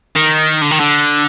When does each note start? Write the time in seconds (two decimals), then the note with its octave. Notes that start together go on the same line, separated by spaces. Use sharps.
0.16 D#3
0.62 D3
0.71 D#3
0.80 D3